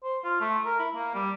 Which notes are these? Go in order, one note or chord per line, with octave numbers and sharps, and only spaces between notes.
C5
F4
A3
A#4
E4
A#3
G3